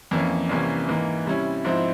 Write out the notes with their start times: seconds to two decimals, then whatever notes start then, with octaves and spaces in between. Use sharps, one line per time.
0.11 F2 E3 A#3 C#4
0.49 C2 C3 E3 A#3 C#4
0.88 G#2 E3 A#3
1.26 C3 G3 C#4 E4
1.65 G#2 F3 C4 E4